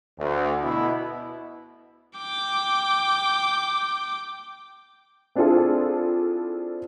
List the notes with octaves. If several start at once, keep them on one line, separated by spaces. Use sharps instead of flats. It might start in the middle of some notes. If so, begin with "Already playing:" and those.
D2
B2 E4
G5 D6
C4 D4 E4 F4 G#4 A4